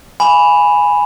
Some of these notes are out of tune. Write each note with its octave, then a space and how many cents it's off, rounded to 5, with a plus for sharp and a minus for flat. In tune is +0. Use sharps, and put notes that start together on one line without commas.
G#5 -5 B5 +0